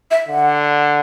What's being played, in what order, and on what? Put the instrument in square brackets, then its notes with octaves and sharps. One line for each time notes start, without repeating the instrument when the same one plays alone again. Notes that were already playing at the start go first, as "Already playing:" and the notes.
[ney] E5
[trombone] D3 [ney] F#5